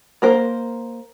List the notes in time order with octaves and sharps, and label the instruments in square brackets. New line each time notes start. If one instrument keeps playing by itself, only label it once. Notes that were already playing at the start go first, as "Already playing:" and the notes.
[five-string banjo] A#3 A#4 C5